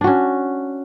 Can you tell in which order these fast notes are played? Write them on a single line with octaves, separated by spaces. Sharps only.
D4 F#4 C#4